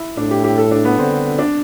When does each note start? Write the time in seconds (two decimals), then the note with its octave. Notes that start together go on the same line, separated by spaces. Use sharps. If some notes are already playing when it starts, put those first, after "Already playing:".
Already playing: E4
0.17 A2 D4
0.31 G4
0.44 G4
0.58 A4
0.71 D4
0.85 B3
0.97 D3 C4
1.39 D4